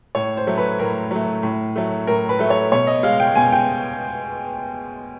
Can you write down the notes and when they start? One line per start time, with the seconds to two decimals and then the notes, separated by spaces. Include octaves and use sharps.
0.15 A2 C#5
0.37 C5
0.47 F#3 A3
0.58 B4
0.79 A2 A#4
1.11 F#3 A3
1.43 A2
1.76 F#3 A3
2.07 A2 A#4
2.29 B4
2.39 F#3 A3
2.50 C#5
2.72 B2 C#5
2.87 D#5
3.03 G#3 F5
3.20 G5
3.35 B2 G#5
3.52 G5